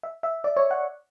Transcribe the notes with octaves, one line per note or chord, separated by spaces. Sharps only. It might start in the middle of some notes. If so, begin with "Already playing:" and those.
E5
E5
D5
C#5
F#5